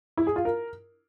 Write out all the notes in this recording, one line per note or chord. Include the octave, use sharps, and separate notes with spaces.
E4
G#4
F4
A#4